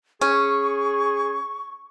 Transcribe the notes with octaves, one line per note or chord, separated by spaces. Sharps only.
C#4 G#4 C#6